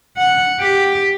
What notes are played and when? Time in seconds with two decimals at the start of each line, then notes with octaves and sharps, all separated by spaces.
0.18 F#5
0.61 G4